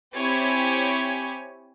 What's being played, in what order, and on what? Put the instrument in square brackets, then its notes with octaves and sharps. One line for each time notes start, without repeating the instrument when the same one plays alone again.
[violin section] C4 E4 G4 C#5 G#5